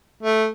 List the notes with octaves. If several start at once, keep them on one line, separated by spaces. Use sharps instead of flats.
A3